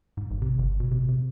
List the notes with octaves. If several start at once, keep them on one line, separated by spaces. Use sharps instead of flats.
G#2
A1
C3
G1
B2
C3
C3